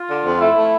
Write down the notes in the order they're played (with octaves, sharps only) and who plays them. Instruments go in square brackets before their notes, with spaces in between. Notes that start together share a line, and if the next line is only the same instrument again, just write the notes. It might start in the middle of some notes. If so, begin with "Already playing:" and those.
Already playing: [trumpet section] F4
[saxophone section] D3
F2
[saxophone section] A3 [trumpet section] E4
[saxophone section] A3